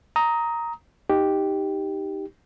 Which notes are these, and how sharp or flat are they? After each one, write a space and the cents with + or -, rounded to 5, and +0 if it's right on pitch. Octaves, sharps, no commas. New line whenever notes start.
A#5 +0 D#6 +20
D#4 +0 G4 +0